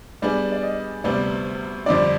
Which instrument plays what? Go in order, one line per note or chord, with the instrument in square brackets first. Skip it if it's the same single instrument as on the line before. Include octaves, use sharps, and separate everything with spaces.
[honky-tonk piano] G3 B3 D4 G#4 [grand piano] D5
[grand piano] D5
D#5
[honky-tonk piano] D2 C3 G3 B3 [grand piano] D5
[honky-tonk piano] F2 D3 G3 D4 [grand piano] D5